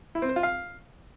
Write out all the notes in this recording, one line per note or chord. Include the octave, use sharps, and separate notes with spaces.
E4
C4
C5
F4
F5